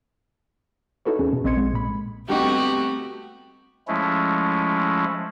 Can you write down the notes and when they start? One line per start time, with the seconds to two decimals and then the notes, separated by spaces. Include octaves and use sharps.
1.05 D#4 E4 F#4 A4 B4 C#5
1.19 E2 C#4 G#4
1.33 B2
1.44 A#1 C4 D#5 C6 G#6 C#7
1.57 G#3
1.74 A#2 B5
2.29 D3 G3 A3 B3 C4 D#4 F#4 G4
3.88 F3 G#3 A3 C#4 E4